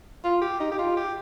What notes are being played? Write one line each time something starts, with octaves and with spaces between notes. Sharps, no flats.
F4
G4
D#4
G4
F4
G4